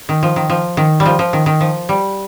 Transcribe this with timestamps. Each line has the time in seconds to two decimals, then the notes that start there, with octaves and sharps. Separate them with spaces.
0.09 D#3
0.23 F3
0.36 D#3
0.50 F3
0.77 D#3
1.00 G3
1.06 F3
1.19 F3
1.33 D#3
1.46 D#3
1.61 F3
1.89 G3